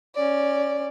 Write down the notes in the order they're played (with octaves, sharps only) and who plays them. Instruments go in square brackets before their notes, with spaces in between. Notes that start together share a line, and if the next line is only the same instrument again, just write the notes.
[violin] C#4 D5